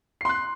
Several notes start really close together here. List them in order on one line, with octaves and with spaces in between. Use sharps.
C7 C6 F#6